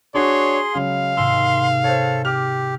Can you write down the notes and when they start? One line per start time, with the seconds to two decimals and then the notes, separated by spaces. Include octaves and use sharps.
0.15 D4 F#4 G#4 C#5 C6
0.75 C#3 F#3 G#3 F5
1.17 G#1 G#2 C3 C6 E6
1.84 A4 C5 C#5
2.25 G4 D6 F6